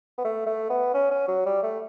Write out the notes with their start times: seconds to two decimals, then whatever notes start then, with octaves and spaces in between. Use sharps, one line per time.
0.18 B3
0.25 A3
0.47 A3
0.70 B3
0.94 C#4
1.11 C#4
1.28 F#3
1.46 G3
1.63 A3